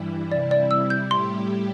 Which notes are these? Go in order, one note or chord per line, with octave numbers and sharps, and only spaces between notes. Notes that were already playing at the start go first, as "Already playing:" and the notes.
Already playing: G2 E3 G3 E4
C3 G3 E4 D5
D5
E6
G6
A2 G3 E4 G4 C6